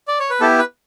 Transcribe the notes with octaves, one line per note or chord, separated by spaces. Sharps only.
D5
C#5
B4
B3 E4 G4 A4
B4